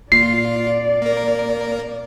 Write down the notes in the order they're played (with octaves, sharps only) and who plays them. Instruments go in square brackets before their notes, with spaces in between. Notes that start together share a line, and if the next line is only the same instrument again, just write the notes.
[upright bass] A#2 [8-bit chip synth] F4 [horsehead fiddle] D5 [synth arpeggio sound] C7
[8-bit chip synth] A#3 A#4